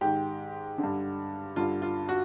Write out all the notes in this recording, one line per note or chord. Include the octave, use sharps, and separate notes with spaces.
G#2 D#3 G4
D3
G2
G2 D3 F4
F4
F#4